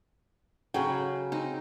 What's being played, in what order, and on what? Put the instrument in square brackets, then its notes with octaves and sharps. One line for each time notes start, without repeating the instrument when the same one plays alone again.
[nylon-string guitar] C#3 G#4 G5 [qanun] F#3
[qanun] C4 D#4